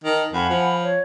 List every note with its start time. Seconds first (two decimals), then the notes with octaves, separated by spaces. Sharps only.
0.04 D#3 A5
0.33 F2 F#5 G#5 B5
0.50 F3
0.83 C#5